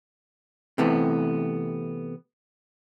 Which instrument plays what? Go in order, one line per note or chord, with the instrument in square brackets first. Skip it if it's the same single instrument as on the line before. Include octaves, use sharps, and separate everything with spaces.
[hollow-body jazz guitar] C3 E3 A3 B3